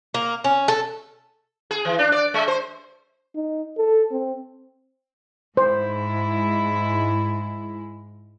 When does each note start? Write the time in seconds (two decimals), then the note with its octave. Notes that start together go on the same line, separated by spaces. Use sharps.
0.14 A#3
0.44 C#4
0.68 A4
1.71 G#4
1.85 E3
1.99 D4
2.12 D5
2.34 G#3
2.48 C5
3.35 D#4
3.77 A4
4.11 C4
5.57 G#2 G#3 E4 C5